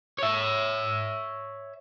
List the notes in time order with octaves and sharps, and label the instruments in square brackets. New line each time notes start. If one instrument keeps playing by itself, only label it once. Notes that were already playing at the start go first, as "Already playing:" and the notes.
[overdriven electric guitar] C#5 E5